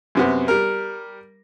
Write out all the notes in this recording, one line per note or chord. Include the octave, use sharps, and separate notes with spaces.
F#2 C3 B3
G3 A#4